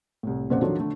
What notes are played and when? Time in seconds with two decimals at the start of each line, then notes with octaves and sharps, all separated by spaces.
0.23 C2 A2
0.50 F2 A#2 C#3 C5 D5 F#5
0.62 D#3 F3 F#3 D4 A4 C#5
0.80 D3 A3